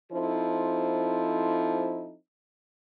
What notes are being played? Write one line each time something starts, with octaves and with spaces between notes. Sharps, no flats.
F3 C4 D#4 E4 A4 C5